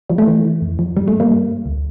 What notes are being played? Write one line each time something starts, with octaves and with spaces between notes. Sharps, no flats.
F3 G3
A3
E3
E3
F2
F3
G2 G3
A3
G2
G3 A#3
G2
G2
D2